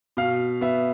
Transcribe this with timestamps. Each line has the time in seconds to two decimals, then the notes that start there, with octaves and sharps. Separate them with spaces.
0.17 B2 F5
0.61 B3 E5